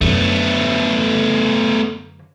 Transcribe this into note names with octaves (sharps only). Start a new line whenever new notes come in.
F#2 D3 A3 B3